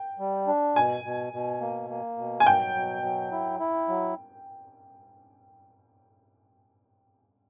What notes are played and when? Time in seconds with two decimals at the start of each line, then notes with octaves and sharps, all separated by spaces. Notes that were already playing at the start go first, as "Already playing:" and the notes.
Already playing: G5
0.19 G3
0.48 D4
0.75 B2 G#5
1.04 B2
1.33 B2
1.61 A#3
1.90 A#3
2.18 B2
2.40 G#5
2.46 F#3 G5
2.75 B2
3.03 F#3
3.32 E4
3.60 E4
3.88 F#3